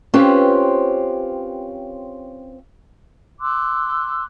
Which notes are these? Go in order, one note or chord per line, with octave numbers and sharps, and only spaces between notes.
C4 C#4 F4 G4 B4 C5
C6 D6 E6 F#6